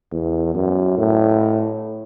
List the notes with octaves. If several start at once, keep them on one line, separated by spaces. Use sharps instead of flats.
E2
F#2
A2